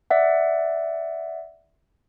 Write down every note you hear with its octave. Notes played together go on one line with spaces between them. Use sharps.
D5 E5 F#5